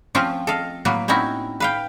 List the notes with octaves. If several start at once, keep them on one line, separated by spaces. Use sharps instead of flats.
F3 A3 C4 C#4 F4
A4 D#5 F5
A2 F#3 A#3 B4
C4 C#4 D#4 E4 F#4
B4 F5 G5